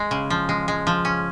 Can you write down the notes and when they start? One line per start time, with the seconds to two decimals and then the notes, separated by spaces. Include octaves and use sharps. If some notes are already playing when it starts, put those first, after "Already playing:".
Already playing: G#3
0.11 C#3
0.30 F3
0.49 G#3
0.68 G#3
0.87 F3
1.05 C#4